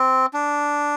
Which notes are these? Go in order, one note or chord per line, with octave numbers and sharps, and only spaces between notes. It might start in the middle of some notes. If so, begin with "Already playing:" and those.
Already playing: C4
D4